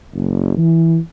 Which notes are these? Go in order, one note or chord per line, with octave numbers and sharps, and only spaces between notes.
F#1
E3